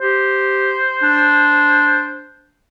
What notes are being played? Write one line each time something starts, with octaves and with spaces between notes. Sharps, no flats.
G4 C5
D4